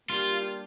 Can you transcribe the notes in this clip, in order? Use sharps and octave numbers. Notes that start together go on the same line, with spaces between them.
G3 A#3 D4 F4 G4